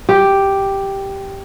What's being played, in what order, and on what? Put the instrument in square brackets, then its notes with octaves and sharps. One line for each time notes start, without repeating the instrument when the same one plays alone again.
[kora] G4